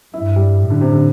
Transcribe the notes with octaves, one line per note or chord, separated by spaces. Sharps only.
G2 E4
G3
A2
D3
C3
D3